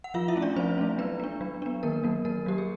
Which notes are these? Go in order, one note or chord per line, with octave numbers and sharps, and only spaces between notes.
F#5
F3 F4 F5
E4 E5
A3 C#4
D4 D5
F3 C4 C5
A3 C#4
F#3 B3 B4
B3 D4
F#3
B3 D4
D#3 A#3 A#4
F#3 A#3
D#3 A#3 A#4
F#3 A#3 G4
G#4